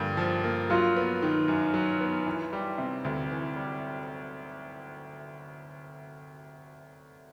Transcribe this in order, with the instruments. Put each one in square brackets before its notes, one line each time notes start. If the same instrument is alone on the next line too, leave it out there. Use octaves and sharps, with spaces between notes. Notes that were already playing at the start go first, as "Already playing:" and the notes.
Already playing: [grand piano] G2 D3 F3 A#3
F3
A#3
[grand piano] F#3 [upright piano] F4
[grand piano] B3
D#3
F#2
F#3
B3
E3
G3
C3
D2
E3
G3